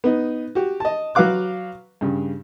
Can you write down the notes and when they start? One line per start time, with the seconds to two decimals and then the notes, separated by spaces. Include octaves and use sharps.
0.04 B3 D#4
0.55 F#4 G4
0.80 D#5 A5
1.15 F#3 F#4 B4 F5 D6 F#6
2.01 G2 C#3